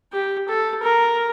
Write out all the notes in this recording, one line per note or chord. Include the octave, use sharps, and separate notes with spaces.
G4
A4
A#4